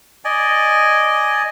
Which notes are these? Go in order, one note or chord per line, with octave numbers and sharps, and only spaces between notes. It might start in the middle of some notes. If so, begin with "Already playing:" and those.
D5 D#5 G#5